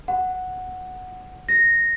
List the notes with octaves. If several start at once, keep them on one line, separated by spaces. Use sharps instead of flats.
F#5
A#6